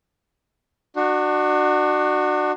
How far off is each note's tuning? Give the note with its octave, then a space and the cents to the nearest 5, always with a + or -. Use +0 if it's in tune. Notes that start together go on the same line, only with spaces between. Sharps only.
D4 +35 F#4 +0